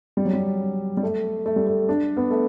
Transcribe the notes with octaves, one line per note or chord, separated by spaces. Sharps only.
G3
F#3
G3
G3
A3
A3
G3
A3
D4
B3
A3